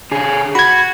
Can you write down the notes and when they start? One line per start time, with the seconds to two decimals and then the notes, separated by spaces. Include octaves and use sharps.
0.11 D3 G#4
0.55 F#4 B5 G#6